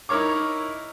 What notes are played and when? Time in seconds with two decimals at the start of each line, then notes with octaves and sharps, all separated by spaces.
0.09 D#4 E4 A#4 C#5 D6